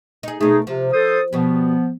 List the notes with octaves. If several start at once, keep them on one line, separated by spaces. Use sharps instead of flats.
D#4 G#4
B2 A3 D#4 G#4
C3 F3
A4 C5 D#6
B2 F3 G3 B3